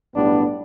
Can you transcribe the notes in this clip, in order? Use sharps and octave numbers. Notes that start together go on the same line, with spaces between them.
B1 A2 G3 B3 D4